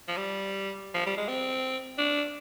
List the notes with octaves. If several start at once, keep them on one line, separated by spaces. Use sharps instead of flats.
F3
G3
F3
G3
G#3
C4
D4